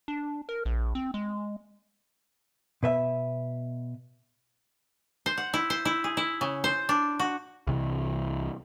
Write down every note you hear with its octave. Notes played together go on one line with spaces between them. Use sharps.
D4
A#4
A#1
C4
G#3
B2 B4 E5
C5
F#5
E4
C5
E4
G#4
E4
C#3
C5
D4
F#4
C2 C3 E3